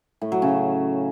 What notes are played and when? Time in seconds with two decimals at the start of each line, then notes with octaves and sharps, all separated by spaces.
0.21 A2
0.32 F#3
0.42 C#3